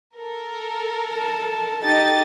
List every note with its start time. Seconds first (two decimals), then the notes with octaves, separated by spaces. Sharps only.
0.18 A4 A#4
1.13 A5
1.83 D#4 G4 A4 D#5 A6